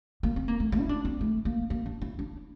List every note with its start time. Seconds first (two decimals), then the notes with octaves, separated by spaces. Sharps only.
0.23 A#3
0.36 C4
0.48 A#3
0.60 A3
0.72 A3
0.80 E4
0.89 D4
1.05 C4
1.21 A3
1.45 A#3
1.70 A#3
1.86 D4
2.01 E4
2.19 D4